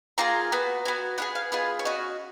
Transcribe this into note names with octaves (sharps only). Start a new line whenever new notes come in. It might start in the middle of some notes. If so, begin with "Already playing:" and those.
A#3 F4 G#4 A#5
B3 F#4
B3 F#4 G#5
B3 F4 G#4 F#5
F5
B3 F4 G#4 D#5
C#5
C#4 F#4 D#5